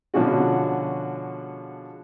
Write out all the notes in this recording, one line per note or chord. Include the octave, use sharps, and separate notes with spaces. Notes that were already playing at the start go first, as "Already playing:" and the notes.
B2 D3 F3 G#3 C#4 F#4